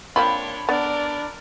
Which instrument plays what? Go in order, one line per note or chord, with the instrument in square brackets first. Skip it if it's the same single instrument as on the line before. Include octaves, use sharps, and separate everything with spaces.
[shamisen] A#3 C4 F4 [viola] D4 C#5 [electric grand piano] B5
[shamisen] B3 [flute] D4 [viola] A#4 D5